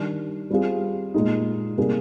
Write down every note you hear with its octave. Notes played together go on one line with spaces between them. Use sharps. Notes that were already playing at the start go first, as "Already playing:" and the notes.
Already playing: D#3 G3 D4
G3 C4 F4 G#4
A#2 G#3 D#4
C3 G3 A#3 D#4 G#4